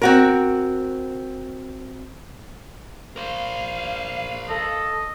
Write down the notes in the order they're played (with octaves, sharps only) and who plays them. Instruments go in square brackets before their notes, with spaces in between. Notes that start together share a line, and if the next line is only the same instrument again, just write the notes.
[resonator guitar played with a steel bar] C4 F#4 A#4
[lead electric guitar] A#4 C5 [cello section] F5
[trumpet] A4 [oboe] D#5